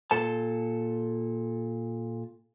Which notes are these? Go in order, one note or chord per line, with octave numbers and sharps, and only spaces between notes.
A#2 A4 A5